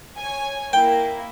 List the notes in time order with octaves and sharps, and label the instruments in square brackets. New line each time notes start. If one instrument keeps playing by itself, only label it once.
[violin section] C#5 G#5
[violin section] A#3 E4 [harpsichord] G5